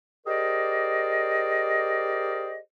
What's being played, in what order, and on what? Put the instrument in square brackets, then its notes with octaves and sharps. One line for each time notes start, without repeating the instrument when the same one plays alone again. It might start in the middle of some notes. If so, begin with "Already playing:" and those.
[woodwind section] G4 G#4 A#4 C5 D5 D#5